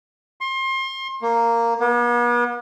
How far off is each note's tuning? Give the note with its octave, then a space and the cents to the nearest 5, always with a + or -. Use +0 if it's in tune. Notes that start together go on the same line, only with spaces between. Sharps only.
C6 +30
A#3 -5
B3 -45